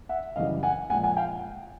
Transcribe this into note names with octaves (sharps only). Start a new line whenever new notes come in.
E5 F#5
F#2 C#3 E3 G3 D#5 F5
F#5 G#5
A#2 F3 G#3 F#5 G#5
F#5 G#5
F5 G5